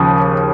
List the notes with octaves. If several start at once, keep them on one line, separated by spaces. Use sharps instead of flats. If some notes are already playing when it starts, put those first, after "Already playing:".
Already playing: D#2 C#3 F3 D#6